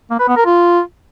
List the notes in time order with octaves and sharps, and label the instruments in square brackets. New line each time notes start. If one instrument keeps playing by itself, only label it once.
[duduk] A#3
B4
B3
A#4
F4